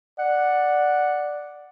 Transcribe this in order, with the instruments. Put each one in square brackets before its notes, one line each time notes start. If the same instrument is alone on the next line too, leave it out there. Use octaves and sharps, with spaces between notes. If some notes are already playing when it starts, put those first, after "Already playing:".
[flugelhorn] D5 [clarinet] F#5